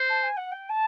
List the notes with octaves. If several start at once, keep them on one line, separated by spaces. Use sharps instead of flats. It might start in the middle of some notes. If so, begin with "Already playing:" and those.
Already playing: C5
A5
G#5
F#5
G5
A5